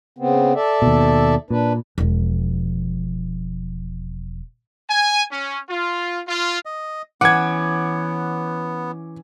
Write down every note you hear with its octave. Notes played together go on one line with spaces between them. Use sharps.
C#3 B3 C4
A4 D5 E5
D#2 B2
A#2 D4 B4
E1 F3
G#5
C#4
F4
F4
D#5
E3 B3 C#4 F#5 D6 G#6